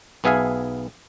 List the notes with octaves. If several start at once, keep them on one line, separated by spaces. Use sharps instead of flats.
B1 B3 G#4 E5 F5 G#5